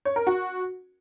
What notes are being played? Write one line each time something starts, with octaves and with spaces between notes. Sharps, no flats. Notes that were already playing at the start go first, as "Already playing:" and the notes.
C#5
A#4
F#4